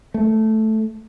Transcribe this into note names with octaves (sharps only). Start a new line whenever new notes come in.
A3